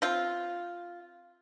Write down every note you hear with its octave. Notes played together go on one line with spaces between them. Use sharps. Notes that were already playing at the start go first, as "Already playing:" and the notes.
C4 F4